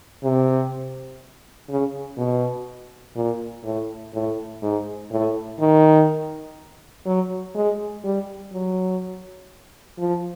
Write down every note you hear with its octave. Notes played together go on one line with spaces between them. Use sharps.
C3
C#3
B2
A#2
A2
A2
G#2
A2
D#3
F#3
G#3
G3
F#3
F3